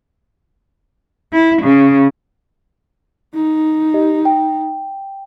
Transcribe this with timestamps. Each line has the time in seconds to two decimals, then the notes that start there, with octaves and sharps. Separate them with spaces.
1.33 E4
1.63 C#3
3.35 D#4
3.94 G4 D#5
4.25 G5